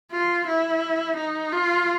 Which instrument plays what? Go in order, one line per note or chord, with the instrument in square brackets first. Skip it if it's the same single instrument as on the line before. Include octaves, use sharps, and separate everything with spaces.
[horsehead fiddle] F4
E4
D#4
F4